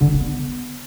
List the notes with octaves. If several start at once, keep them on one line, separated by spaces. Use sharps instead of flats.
D3
A3
D3
B3